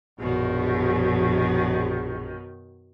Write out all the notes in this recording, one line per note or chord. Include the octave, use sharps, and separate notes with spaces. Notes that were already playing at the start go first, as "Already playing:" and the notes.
A#1 F#2 B2 D#3